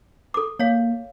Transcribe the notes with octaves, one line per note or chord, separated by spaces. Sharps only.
A4 D6
A#3 C#5 F5